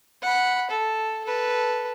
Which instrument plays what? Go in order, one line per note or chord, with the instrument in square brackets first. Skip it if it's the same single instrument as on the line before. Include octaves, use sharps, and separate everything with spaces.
[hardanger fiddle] F#5 B5
A4
A4 B4